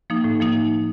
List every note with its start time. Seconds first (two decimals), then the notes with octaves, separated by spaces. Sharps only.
0.10 F3 A#3 D#4
0.24 A2
0.40 F3 A#3 D#4